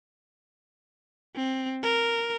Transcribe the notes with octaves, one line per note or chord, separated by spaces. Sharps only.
C4
A#4